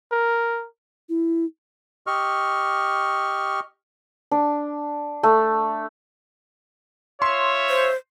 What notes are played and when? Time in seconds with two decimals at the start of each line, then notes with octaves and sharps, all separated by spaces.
0.12 A#4
1.09 E4
2.07 G4 D#5 C#6 F6
4.31 D4
5.23 A3
7.22 F4 C#5 E5 C6
7.70 C5